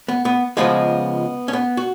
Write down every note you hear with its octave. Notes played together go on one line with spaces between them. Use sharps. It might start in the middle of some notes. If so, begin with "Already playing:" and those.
B3
B3
C#2 C#3 F3 G#3 B3
C#4
B3
F#4